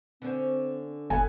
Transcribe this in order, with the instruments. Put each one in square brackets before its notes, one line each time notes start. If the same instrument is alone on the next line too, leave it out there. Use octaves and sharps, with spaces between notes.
[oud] D3 C#4 C5 [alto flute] C4
[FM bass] G1 [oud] B3 [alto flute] A4 [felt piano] G#5